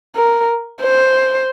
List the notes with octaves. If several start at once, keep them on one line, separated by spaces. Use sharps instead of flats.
A#4
C5